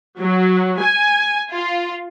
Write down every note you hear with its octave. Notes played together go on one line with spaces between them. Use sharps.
F#3
G#5
F4